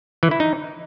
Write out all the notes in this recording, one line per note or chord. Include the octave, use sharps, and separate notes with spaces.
E3
E4
D#4